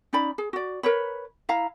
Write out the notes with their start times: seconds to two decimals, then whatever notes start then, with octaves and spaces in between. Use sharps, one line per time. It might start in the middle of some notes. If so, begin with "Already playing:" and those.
0.13 C#4 D#4 D5 B5
0.38 G#4
0.53 F#4 D5
0.83 A#4 B4 C#5 B5
1.49 E4 F5 A#5